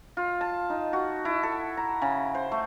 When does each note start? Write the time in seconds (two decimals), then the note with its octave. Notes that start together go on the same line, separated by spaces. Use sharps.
0.17 F4
0.41 A5
0.70 D#4
0.93 F#4
1.25 E4
1.43 A4
1.77 A#5
2.02 C#3
2.35 C5
2.51 A3